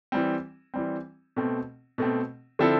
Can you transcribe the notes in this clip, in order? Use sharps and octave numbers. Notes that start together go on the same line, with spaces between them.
E3 G3 C4
E3 G3 C4
B2 A3 C4
B2 A3 C4
D3 F3 C4 E4 A4